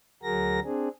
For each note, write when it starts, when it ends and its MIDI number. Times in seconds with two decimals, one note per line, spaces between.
0.23 0.60 38
0.23 0.60 54
0.23 0.60 66
0.23 0.60 68
0.23 0.60 70
0.23 0.60 94
0.64 0.88 60
0.64 0.88 62
0.64 0.88 68